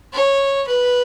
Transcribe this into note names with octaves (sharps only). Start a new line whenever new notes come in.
C#5
B4